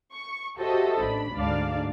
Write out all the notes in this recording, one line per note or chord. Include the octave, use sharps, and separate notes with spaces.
C#6
F#4 G4 A4 C5 D#5 E5
A1 D4 B5
D2 G#2 D4 D5 F5